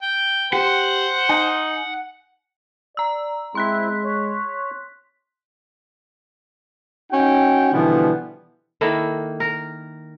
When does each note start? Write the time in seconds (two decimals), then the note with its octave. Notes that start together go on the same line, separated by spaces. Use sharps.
0.02 G5
0.53 G4 C5 F#5
1.29 D#4 G#5
2.97 D5 A#5 E6
3.55 G#3 C4 E4 C6 F#6 B6
4.04 C#5
7.12 C#4 D#4 F#4 G5
7.72 B2 D3 E3 F3 G3 B3
8.81 D#3 A#3 E4 A4
9.40 A#4